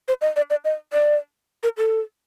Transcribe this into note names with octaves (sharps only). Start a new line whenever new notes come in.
C5
D#5
D5
D5
D#5
D5
A#4
A4